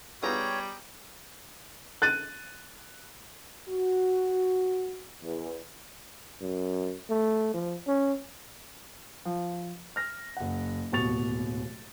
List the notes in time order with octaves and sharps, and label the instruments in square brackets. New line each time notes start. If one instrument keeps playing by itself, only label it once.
[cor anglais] G3 [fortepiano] B3 F4 G#4 [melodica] C#5 [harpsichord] G5 A#5 D#6
[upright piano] F#6 A6 D#7
[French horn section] F#4
E2
[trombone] F#2
A3
F3
C#4
[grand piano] F3
F6 A#6
F#1 F#5
D1 D#2 B2 C#6 A6 F7